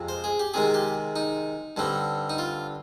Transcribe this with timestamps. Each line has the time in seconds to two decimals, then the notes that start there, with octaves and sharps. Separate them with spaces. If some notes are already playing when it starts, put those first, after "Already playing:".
Already playing: F2 C3 F3 G#3
0.09 C5
0.24 G#4
0.39 G4
0.54 C3 D#3 G#3 G#4
0.74 G4
1.16 D#4
1.77 G2 D3 G3 C4
2.30 D#4
2.38 F4